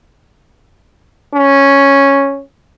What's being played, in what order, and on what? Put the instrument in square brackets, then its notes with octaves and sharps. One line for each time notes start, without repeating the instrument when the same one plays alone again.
[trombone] C#4